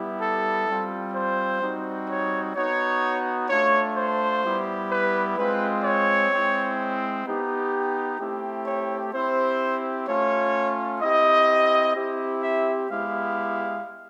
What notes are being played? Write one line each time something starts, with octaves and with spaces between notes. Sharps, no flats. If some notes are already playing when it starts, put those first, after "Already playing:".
Already playing: G3 B3 E4 G4
A4
G3 C4 F4
C5
G3 C4 D#4 F#4
C#5
B3 D#4 F#4 C#5
A3 D4 F4 C#5
C5
G3 B3 E4 G4
B4
G#3 C4 F4 B4
C#5
G#3 C4 E4
B3 D#4 G4
A3 C4 E4 G4
C#5
C4 E4 G4 C5
A3 C#4 F4 C#5
C4 E4 G4 D#5
C4 E4 G4
E5
G#3 B3 E4 G4 F5